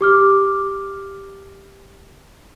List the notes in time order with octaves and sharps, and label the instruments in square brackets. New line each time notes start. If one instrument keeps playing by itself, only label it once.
[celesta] G4 D6 F6